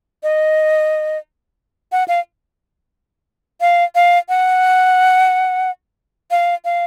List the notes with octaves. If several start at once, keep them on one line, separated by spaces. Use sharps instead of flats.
D#5
F#5
F5
F5
F5
F#5
F5
F5